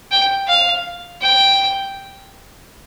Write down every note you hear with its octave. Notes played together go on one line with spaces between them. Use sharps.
G5
F5
G5